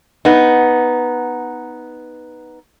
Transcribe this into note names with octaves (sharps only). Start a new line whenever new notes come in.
B3 D#4